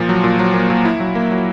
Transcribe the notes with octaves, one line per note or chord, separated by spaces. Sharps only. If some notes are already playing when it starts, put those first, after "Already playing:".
Already playing: A#2 F3
F#3
A#2
F#3
A#3
A#2
E4
F#3
A#3
F#3